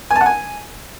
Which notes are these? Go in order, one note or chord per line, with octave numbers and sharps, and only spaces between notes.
G#5
A5
F#5
G#5